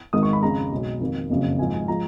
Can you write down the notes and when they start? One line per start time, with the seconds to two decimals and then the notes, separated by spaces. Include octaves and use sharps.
0.13 G#1 G#2 D#3 D#6
0.23 C#6
0.33 B5
0.42 F2 C#3 G#3 A#5
0.71 B1 B2 G#3
1.00 F2 D#3 A#3
1.30 F#1 F2 C#3 F#3
1.58 G#1 G#2 F3 G#5
1.74 G#5
1.88 F3 G#3 A#5